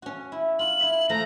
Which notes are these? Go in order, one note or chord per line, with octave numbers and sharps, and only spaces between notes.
C#4 F#4
E4
F4 F#7
E4 E5
F3 A3 E5 A#5